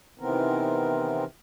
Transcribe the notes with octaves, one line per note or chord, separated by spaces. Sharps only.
C3 D#3 E3 B3 C4 A#4